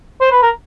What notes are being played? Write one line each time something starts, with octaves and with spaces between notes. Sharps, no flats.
C5
B4
A#4